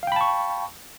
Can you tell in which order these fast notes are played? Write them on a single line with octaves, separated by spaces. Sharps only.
F5 G5 B5 A5 C#6